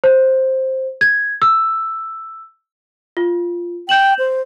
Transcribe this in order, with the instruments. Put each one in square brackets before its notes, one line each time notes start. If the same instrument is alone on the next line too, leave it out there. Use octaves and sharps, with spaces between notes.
[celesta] C5
G#6
E6
F4
[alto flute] G5 [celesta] G6 E7 F#7
[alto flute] C5